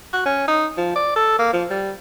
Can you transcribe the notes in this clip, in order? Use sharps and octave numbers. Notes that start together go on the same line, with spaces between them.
F#4
C#4
D#4
F3
D5
A4
A#3
F3
G3